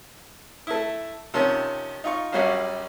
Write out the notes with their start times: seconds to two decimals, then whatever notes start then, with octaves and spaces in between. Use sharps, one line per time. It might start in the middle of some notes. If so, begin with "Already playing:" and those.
0.67 A3 E4
1.34 C3 D#3 F3 C#4
2.04 D#4 F4 C#6
2.32 A#1 F#2 G3 C#4 F#4 F5